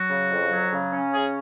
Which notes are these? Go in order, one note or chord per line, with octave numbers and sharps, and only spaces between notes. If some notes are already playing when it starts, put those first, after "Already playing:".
Already playing: F#3 F#4
C#3
F2
F#3
C#3
C#4
C#3 G#4